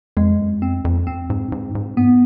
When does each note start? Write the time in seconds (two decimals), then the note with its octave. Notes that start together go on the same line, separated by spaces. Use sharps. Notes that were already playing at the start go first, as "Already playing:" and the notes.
0.17 F2 G#3
0.40 F#2
0.62 F2 C4
0.85 F2
1.07 C4
1.30 G#2
1.52 G#2
1.75 G#2
1.97 G2 B3